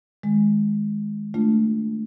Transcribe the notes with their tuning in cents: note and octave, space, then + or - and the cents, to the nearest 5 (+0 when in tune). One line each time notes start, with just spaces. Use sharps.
D#3 +0 G#3 +0
A3 +5 D4 -5 F4 -10